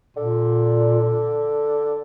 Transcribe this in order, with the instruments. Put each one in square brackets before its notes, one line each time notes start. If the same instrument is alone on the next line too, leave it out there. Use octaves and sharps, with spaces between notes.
[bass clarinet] A#2 [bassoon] D3